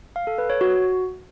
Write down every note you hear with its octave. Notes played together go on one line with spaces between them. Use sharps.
F5
A4
B4
C#5
F#4